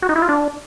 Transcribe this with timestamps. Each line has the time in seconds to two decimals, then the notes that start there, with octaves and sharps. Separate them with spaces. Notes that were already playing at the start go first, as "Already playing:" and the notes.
0.02 F#4
0.09 D#4
0.16 E4
0.22 F4
0.29 D4